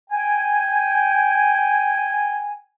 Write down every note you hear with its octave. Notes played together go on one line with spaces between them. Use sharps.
G5 G#5